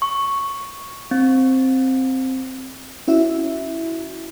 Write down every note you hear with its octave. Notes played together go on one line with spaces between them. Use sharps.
C#6
C4
C#4 E4 F#4 E5